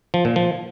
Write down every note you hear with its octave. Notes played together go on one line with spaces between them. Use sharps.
F3
A#2
F3